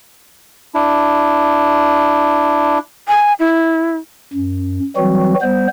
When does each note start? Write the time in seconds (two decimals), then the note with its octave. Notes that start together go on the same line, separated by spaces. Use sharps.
0.75 D4 E4
3.08 G#5
3.39 E4
4.33 F#2
4.97 E3 F#3 G3 C4 F#4
5.42 G3 B3 C5